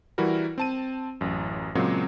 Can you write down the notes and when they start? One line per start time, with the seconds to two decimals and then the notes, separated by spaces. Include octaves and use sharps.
0.18 E3 G3 E4 F#4 A#4
0.58 C4 A5 D#7
1.21 A1 F#2
1.75 A#2 C#3 F#3 G#3 A#3 C4